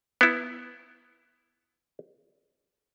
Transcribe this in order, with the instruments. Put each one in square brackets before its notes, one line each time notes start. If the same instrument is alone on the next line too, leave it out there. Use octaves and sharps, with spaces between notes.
[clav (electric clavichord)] B3 E4